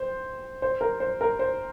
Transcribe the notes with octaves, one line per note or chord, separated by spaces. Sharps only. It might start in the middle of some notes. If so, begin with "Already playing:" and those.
Already playing: C5
C5
A#4
C5
A#4
C5